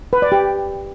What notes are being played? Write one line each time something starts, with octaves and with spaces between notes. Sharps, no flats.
B4
D5
G4